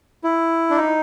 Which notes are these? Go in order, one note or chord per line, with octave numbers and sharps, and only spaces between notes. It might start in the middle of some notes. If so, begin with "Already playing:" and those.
E4
D4
D#4